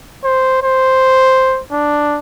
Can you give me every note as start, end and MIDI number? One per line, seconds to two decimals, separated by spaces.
0.24 0.60 72
0.63 1.61 72
1.72 2.19 62